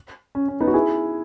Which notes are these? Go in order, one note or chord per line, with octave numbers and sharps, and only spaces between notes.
C#4
C#4
B3 D#4
F#4
E4 G#4